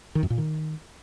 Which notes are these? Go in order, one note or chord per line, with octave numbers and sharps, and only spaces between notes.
D#3
F#2
A#2
D#3